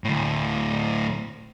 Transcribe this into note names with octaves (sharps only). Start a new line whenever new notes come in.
D2 A2